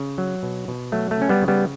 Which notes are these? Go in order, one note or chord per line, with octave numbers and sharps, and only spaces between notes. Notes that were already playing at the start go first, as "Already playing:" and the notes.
Already playing: C#3
F#3
B2
B2
F#3 A3
A3
C#3 C#4
G3 B3
C#3
G3 B3